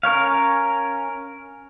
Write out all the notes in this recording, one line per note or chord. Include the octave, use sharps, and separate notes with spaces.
C#4 A#4 C#5 F5